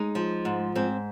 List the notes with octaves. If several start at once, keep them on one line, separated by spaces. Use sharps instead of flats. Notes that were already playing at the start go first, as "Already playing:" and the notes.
Already playing: G#3 D#4
F3
G#2
G#2 C4